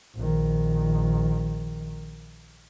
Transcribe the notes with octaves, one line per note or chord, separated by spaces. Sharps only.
A#1 D#3